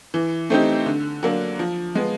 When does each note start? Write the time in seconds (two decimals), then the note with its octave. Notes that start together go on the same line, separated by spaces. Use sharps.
0.14 E3
0.50 A3 C4 D#4 G4
0.86 D3
1.23 F#3 A#3 D4
1.59 F3
1.95 G#3 B3